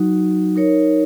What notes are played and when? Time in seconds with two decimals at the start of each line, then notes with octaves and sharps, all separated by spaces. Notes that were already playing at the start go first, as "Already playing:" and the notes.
Already playing: F#3 D#4 F#4
0.56 D#4 A#4 C#5